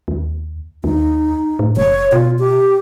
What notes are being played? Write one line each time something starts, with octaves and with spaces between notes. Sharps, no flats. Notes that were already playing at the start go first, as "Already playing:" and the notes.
D#2
D#2 D#4
A2
F#1 C#5
B2 F4
G4